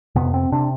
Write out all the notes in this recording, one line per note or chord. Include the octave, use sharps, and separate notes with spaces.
F2 C3 B3
C4
C3 D4